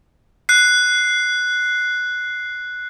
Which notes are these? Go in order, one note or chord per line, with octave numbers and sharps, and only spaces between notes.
F#6 C7